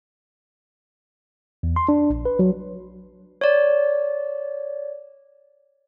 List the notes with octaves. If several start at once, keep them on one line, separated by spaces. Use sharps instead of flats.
E2
C6
D4
A#1
B4
F#3
C#5 D5